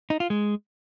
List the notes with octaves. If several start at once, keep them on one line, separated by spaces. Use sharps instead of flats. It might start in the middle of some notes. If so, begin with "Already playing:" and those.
D#4
F4
G#3